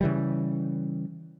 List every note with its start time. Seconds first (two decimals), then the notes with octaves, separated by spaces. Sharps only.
0.01 C#3 E3 G3